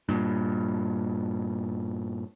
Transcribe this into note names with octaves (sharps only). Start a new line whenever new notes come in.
G2 A#2